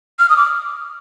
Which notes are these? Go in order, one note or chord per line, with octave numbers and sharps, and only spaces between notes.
F6
D#6
D6